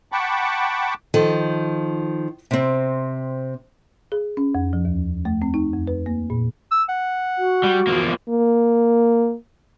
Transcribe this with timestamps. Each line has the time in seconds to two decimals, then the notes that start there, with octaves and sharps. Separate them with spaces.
0.12 F#5 G5 A5 B5 C#6 D6
1.14 D#3 F3 A4
2.51 C3 C4
4.12 G#4
4.37 C#4
4.55 F2
4.73 F3
4.85 D#2
5.25 A3
5.42 C4
5.54 D#4
5.73 F2
5.87 B4
6.06 A#3
6.30 A#2
6.71 E6
6.89 F#5
7.38 F#4
7.63 G3
7.87 E2 F3 A#3
8.29 A#3